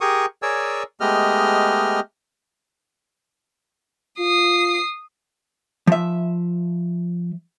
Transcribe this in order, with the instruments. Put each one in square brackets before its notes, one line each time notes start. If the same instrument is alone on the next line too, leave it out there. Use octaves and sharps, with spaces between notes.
[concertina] G4 G#4 A#4 C#6 D#6
G#4 A#4 C#5 D5 G#5 E6
G#3 A3 B3 G4 D#5 F6
[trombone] F4 [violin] D#6 C7
[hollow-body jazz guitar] F3 E5